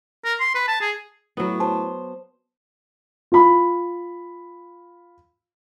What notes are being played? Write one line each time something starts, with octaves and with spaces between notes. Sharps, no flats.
A#4
C6
B4
A5
G#4
A2 F#3 B3
C5 A5
F4 B5